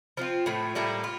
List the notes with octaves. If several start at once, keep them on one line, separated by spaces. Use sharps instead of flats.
F3 C4 F4
A2 F3 A3
A2 G3 A#3 E4
F4